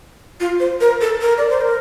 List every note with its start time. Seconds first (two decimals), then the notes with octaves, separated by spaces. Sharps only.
0.40 F4
0.60 C5
0.81 A#4
1.01 A4
1.21 A#4
1.38 D5
1.50 C5
1.61 A#4